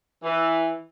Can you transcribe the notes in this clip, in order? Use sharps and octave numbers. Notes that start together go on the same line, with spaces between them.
E3